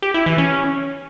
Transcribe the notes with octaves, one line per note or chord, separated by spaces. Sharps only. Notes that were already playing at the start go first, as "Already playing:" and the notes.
G4
E4
E3
C#4